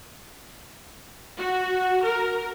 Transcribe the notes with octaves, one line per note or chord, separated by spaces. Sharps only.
F#4
A#4